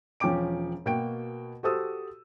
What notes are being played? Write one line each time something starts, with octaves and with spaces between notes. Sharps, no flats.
E1 F3 C#4 G5 D6 D7
B2 A#3 F#4 G5 D7
F#4 G4 A4 C5 D#6 E6